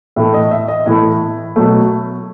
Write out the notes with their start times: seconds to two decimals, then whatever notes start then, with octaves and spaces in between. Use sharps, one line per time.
0.16 A2 E3 A3 E5
0.34 D#5
0.51 E5
0.68 D#5
0.86 A2 E3 A3 E4
1.56 B2 F#3 A3